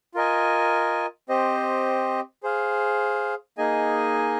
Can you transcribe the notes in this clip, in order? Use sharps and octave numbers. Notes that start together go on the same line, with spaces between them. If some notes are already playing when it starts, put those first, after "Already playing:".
F4 A#4 D#5 G#5
C4 G4 C5 D#5
G#4 C5 F5
A#3 D#4 G#4 D#5 G#5